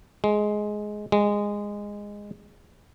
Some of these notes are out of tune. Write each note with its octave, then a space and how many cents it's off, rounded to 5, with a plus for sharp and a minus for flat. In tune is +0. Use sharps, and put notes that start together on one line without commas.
G#3 +10
G#3 -15